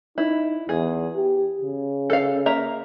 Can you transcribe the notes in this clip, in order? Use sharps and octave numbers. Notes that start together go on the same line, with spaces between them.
D#4 E4
E2 G#4
G4
C#3
A4 F5
A#3 E5 A#5